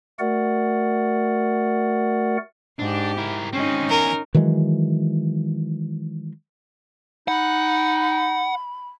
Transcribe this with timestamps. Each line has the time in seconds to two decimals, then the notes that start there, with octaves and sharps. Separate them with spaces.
0.19 A3 F#4 A#4 D5 F#5
2.79 G#2 D4 G4
3.17 E4 A#4
3.53 G#3 C4 C#4 D#4
3.89 E2 A#4 G#5
4.34 D#3 E3 F#3 G#3
7.28 D#4 F#5 B5